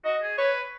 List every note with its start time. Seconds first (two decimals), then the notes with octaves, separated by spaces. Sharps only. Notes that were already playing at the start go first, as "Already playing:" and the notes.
0.05 F#4 D#5
0.22 G#4
0.38 B4 C#5